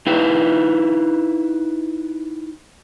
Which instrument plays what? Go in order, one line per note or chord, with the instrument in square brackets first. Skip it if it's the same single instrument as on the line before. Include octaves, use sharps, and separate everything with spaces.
[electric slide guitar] D#4 E4 B4 F5 G5